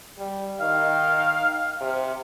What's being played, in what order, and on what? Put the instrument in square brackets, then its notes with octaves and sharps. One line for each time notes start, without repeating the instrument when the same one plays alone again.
[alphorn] G3
[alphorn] D#3 [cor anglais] F5
[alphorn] C3